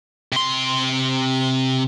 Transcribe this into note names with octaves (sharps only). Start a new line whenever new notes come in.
C3 C6